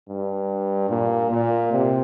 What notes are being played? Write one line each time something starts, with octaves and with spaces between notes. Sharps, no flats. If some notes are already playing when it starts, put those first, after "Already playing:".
G2
A#2
A#2
C3